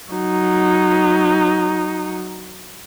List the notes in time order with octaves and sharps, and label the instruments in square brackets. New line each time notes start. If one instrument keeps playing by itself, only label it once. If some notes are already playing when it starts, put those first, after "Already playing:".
[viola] F#3 D#4